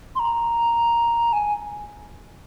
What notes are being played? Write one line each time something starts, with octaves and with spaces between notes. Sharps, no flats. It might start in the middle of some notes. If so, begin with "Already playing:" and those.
C6
A#5
G#5